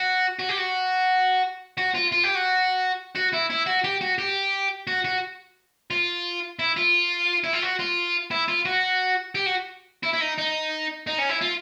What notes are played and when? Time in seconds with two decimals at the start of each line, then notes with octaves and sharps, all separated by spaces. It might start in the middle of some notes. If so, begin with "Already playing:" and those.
Already playing: F#4
0.39 F#4
0.49 G4
0.58 F#4
1.78 F#4
1.95 F4
2.12 F4
2.23 G4
2.35 F#4
3.15 F#4
3.33 E4
3.50 E4
3.66 F#4
3.84 G4
4.01 F#4
4.18 G4
4.87 F#4
5.05 F#4
5.91 F4
6.59 E4
6.77 F4
7.44 E4
7.53 F4
7.63 F#4
7.79 F4
8.31 E4
8.48 F4
8.66 F#4
9.35 G4
9.46 F#4
10.03 E4
10.14 E4
10.21 D#4
10.38 D#4
11.07 D#4
11.18 C#4
11.29 E4
11.42 F4